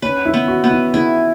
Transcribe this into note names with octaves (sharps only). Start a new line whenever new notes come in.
C#4 B4
E4
B3
F#4
B3
E4
E4 G#4